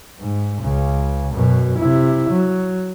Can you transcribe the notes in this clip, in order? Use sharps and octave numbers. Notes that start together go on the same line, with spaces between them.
G#2
C#2 C#3
F#2 B2
C3 E4
F#3